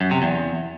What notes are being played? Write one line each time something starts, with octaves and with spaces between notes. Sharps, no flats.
F#2
C3
E2